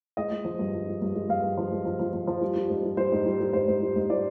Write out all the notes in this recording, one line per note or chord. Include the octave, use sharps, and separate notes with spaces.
G#3 D#5
G#3
F3
G2
F3
G#3
G2
G#3
G2 F5
G2
F3
G#3
F3
F3
F3
F3
G3
G3
G#2
G3
G3 C5
G#2
G3
G3
G#2 C5
G#2
G3
G#2
G3 D5